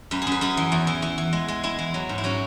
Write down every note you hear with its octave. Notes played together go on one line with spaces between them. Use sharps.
F#2 B4
G#4
F#2 B4
F#2 G#4
E3
E2
E3
E3
E3
G#3
G#3
G#3 E4
E3
F#3
G#2
E4
F#3 C#4